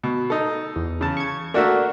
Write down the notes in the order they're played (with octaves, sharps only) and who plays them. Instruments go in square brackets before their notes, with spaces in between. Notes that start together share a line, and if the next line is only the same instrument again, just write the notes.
[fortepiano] B2
D#4 A4
[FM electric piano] E2
[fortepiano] C#3 A5
[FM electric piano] C#6 G#6
[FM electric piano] A3 F#4 E5 [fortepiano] A#3 D4